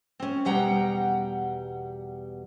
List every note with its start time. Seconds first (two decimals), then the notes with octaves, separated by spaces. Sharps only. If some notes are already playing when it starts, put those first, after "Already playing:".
0.20 C4 C#4
0.45 E2 B2 G3 F#5 G5 A#5